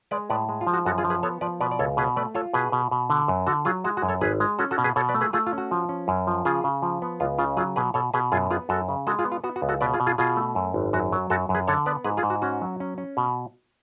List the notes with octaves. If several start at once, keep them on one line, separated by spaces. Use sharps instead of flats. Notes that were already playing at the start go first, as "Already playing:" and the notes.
G#3 B4 D5
A2 B4 D5
G#3
F4
F3
F#4
F#2 F#4 A4
F4 G#4
F3
G#4 B4
B3 A4 C#5
F3 B4 D5
B2 B4 D5
D5
C#2 A4 C#5
B2 G#4 B4
A3 B4 D5
F4 A4 C#5
B2 G#4 B4
B2
B2
D3
F#2
D3 F#4 A4
F#3 F4 G#4
G#3 F#4
F#4
F#2
A4 C#5
G#1 G#4 B4
G#3
C#4 F#4 A4
F#4 A4
B2
G#4 B4
B2 A4 C#5
B4 D5
A3
G#4 B4
A3 F4 G#4
F4
C#4
F#4
F3
C#4
F#2
F3
C#3 F4 G#4
C#3
F3
B3
C#2 F4
C#3 F4
F#3 F4 G#4
B2 G#4 B4
B2 A4 C#5
B2 G#4 B4
F#2 F4 G#4
B3 F4 G#4
F#2 F#4 A4
C#3
G#3 F#4 A4
F4 G#4
B3
F4
B3 F#4
F#4
C#2
F#4 A4
B2 B4 D5
F4 G#4
B2
F4 G#4
B2 F4 G#4
A3
F#2
G#1
F#2 F#4
F#3
F#2 F#4 A4
F#2
G#4 B4
D3 A4 C#5
B3 B4 D5
G#2 G#4 B4
F4 G#4
G#2
F#4
C#4 F#4
F#3
C#4
C#4
B2